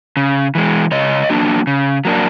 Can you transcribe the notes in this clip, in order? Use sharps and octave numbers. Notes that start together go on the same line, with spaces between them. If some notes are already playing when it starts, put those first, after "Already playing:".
C#3
E3 G#3
C#3 C#5 D#5
F#3 A#3 D4
C#3
F#3 A#3 D4